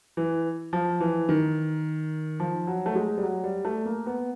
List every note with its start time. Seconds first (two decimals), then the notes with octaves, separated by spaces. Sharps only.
0.17 E3
0.73 F3
1.00 E3
1.29 D#3
2.40 F3
2.67 F#3
2.86 A3
2.95 G#3
3.18 G3
3.23 F#3
3.44 G3
3.65 A3
3.85 A#3
4.06 B3